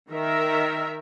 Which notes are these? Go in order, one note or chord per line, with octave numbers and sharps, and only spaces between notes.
D#3 A#4 E5